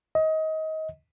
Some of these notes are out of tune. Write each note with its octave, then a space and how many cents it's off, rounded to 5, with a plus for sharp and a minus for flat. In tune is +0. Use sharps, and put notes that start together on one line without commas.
D#5 +25